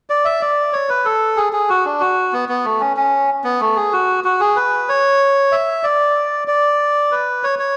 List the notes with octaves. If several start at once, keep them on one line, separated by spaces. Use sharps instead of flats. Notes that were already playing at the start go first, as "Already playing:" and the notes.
D5
E5
D5
C#5
B4
A4
G#4
G#4
F#4
D4
F#4
B3
B3
A3
C#4
C#4
B3
A3
G#4
F#4
F#4
G#4
B4
C#5
E5
D5
D5
B4
C#5
C#5